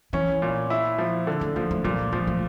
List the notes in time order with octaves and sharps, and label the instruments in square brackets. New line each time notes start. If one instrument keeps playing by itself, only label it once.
[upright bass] E3 [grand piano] C#4
[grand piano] A#2
E4
F3
D3
[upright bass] A3
[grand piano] F3 [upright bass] A#3
[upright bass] A3
[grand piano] A#2 [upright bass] G3
[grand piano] F3 [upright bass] A3
[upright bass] A3